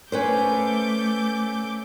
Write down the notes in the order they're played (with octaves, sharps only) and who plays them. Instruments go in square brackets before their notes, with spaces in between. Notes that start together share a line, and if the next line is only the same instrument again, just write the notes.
[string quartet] A3 D6 G6 [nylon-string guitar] C#4 B4 C5